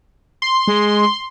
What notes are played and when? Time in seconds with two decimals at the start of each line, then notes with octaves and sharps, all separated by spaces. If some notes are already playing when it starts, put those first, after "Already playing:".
0.42 C6
0.67 G#3